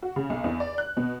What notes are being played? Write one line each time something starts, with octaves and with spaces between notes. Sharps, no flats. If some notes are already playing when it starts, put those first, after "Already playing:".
F#4
C#3
B1
E2
D5
F#6
B2